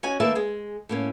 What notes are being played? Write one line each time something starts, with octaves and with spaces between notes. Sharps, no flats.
C#4 F#4 D#5 G#5
D#3 A3 A#3 B4 E5 A5
G#3 G#4
A2 A#3 C#4